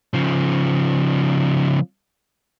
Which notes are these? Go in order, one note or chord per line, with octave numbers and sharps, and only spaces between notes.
C#3 F3